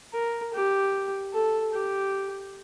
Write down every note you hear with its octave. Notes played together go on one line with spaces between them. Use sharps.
A#4
G4
A4
G4